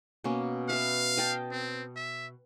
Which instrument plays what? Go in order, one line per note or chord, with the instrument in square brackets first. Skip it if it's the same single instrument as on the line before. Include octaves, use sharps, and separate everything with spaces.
[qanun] B2 A#3 C#4
[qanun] B4 E5 [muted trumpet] F5
[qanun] D#5 G5 A5
[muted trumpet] C4
E5